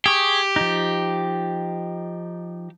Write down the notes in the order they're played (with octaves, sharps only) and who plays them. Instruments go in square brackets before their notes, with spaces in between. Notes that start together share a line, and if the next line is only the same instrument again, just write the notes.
[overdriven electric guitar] G4 [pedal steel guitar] G#4 C#6
[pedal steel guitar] F3 D#4